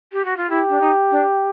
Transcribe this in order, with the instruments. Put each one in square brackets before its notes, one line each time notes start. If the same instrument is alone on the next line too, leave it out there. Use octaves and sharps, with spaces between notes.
[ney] G4
F#4
F4
[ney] E4 [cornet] G4
[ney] D4
D#4
D4